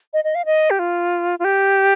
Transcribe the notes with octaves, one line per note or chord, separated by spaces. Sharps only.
D#5
D#5
F5
D#5
G4
F4
F4
G4